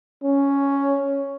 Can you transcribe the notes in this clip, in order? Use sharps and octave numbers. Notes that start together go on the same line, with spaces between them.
C#4